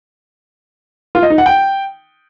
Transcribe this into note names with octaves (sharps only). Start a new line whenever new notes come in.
F4
D#5
D#4
F#5
G5